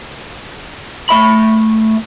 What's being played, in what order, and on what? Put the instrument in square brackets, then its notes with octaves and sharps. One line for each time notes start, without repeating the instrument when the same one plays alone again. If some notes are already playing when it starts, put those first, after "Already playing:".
[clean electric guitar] A3 E5 B5